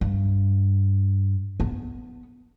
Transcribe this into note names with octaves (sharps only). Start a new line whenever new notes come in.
G2
B3